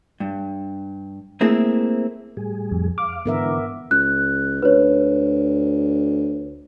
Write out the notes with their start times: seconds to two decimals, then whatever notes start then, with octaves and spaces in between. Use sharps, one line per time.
0.20 G2
1.41 A3 A#3 C4 E4 G#4 A#4
2.37 A2 G3 G#4
2.72 F2
2.98 F5 D6
3.26 G#2 D3 E3 B3 A#4 E5
3.91 C#2 F#6
4.62 D2 B4 C#5